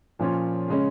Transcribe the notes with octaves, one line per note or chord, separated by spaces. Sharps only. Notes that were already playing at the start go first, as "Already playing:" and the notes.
A#2 F3 C#4 F4 C#5
C#3 G#3 C#4